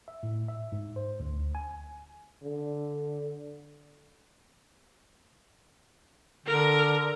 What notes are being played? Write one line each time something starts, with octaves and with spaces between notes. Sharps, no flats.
E5
A2
E5
G#2
C5
D2
G#5
D3
D3 A#4